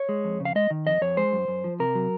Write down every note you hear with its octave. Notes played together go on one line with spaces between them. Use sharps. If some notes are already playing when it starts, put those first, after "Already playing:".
Already playing: C#5
G#3
F2
C#3
F5
G#3 D#5
D#3
F2 D#5
F2 C#5
G#3 C5
F#2
F#2
F3
C3 A#4
F#3